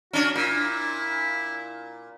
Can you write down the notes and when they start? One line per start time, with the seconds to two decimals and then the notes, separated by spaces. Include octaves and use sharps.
0.13 C#4 D4 F#4
0.35 A#2 E4